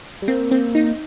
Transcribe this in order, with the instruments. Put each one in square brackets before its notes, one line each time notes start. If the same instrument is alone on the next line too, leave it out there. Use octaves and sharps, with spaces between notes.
[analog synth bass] G3
[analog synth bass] A#3 [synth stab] C4
[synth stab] C4
D#4